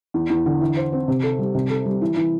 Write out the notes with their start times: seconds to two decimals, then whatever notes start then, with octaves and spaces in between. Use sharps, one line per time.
0.14 E2
0.30 E2
0.46 D3
0.61 E3
0.77 C5
0.92 C4
1.08 C3
1.23 A4
1.39 G3
1.55 C3
1.70 A4
1.86 G3
2.01 E3
2.17 E3